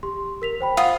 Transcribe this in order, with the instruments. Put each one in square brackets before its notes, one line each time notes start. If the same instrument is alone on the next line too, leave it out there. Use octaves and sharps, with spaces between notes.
[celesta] G4 C6
A#4 B6 F7
C5 G5 B5
[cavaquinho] F4 D#6 [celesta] F#5